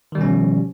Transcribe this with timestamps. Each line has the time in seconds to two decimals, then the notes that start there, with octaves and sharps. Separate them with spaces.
0.12 D#3
0.15 G3
0.18 B2
0.21 C#4
0.24 F3